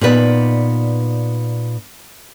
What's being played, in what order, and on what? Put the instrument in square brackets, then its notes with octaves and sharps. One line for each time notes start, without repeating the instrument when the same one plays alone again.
[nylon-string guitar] A#2 B3 D#4 B4 D5